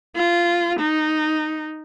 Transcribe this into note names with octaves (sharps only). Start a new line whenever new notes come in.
F4
D#4